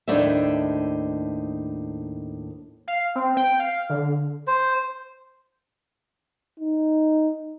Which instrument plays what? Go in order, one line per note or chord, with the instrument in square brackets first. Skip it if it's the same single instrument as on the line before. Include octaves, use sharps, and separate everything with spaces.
[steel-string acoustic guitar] D#2 A2 D4 D#4 C5 E5
[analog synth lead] F5
C4
G5
F5
D3
[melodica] C5
[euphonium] D#4